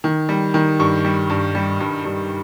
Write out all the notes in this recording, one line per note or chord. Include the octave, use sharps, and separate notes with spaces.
D#3
G3
D#3
G2 C#6
G3
G2
G3
G2
G2